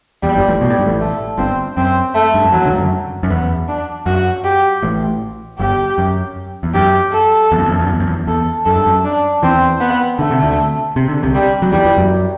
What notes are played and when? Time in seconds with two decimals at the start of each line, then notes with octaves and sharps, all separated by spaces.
0.23 E2 G3
0.36 G1 G2
0.48 A1 A2
0.61 B2 G3
0.70 A2
0.79 G2
0.86 A1 A2
1.00 A3
1.38 G1 G2 C4
1.77 F#2 C4
2.15 A3
2.34 G2
2.44 F#2
2.53 E2 F#3
2.66 D2 D3
2.72 G2
2.78 F#2
3.23 F#2
3.30 E2 B3
3.68 D4
4.06 F#2 F#4
4.44 G4
4.83 A1 A2
5.59 G1 G2 G4
5.98 F#2
6.63 E2
6.74 F#2 G4
7.12 A4
7.52 E2
7.58 F#2
7.66 E2
7.72 F#2
7.80 E2
7.87 F#2
7.93 E2
8.00 F#2
8.07 E2
8.27 E2 A4
8.65 F#2 A4
8.76 G2
8.86 F#2
9.05 D4
9.43 E2 E3 C4
9.81 B3
10.19 D3 A3
10.31 C3
10.42 D2 D3
10.96 C3
11.09 D3
11.23 C2 C3
11.34 G3
11.62 F#3
11.72 E2 E3 G3
11.85 E2 E3
11.98 F#2 F#3